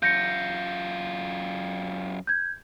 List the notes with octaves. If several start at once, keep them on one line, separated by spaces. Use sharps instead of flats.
F#2 F4 G6 A#6 C#7
G6 G#6